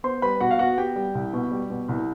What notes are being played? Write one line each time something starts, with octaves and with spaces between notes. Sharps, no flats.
B3 C5 C6
G3 B4 B5
B2 F#4 F#5
F5
B3 F#4 F#5
B3 G4 G5
G3
C2
B2
G3
B2
C2